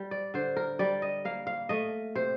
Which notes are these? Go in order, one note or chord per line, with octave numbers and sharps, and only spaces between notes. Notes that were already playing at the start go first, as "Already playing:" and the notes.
Already playing: G3
D5
D3 C5
A#4
G3 D5
D#5
A#3 F5
F5
A3 D#5
C3 C5